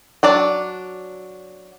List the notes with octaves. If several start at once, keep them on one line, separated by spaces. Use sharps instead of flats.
F#3 D4 D5